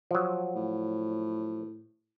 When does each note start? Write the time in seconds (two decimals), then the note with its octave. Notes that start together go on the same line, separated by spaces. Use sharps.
0.11 F3 F#3
0.56 A2